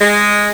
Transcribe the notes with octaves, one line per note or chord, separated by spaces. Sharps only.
G#3